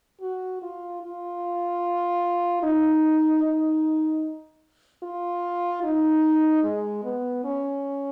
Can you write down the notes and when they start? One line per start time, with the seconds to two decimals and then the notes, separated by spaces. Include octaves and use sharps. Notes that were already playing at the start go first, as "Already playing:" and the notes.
0.21 F#4
0.62 F4
1.02 F4
2.63 D#4
3.43 D#4
5.03 F4
5.83 D#4
6.63 G#3
7.03 B3
7.44 C#4